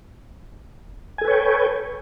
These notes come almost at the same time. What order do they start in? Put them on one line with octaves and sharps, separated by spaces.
G#5 A4 B4 C#5 G5